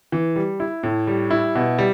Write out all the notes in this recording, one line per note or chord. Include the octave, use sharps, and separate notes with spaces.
E3
G3
E4
A2
G3
E4
B2
G3